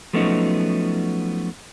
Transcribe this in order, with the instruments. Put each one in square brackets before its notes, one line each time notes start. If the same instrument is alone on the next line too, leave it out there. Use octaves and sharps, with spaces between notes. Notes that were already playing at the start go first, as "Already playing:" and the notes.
[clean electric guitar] F3 F#3 A3 B3 C#4 D#4